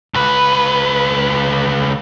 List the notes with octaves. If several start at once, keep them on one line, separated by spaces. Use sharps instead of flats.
C#2 B4